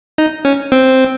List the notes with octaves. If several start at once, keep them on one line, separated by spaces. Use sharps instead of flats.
D#4
C#4
C4